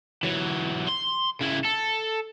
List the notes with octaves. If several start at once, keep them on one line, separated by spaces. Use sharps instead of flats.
E3 F#3
C6
C#3 E4
A4